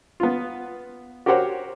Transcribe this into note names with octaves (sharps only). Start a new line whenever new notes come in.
B3 F4
F#4 G4 A#4 C5 C#5 F#5